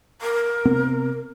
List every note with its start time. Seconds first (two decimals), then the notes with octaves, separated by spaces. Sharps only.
0.21 A#4
0.65 C3 B3 C4